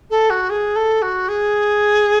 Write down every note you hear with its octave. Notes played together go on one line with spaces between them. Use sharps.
A4
F#4
G#4
A4
F#4
G#4